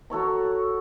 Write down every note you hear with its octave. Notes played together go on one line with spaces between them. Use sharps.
F#4 A4 C#5 A#5